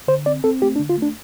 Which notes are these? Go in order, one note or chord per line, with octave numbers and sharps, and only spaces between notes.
D3 C5
C4 D5
C4 A4
A3 G4
D4
D3
F4
A3 D4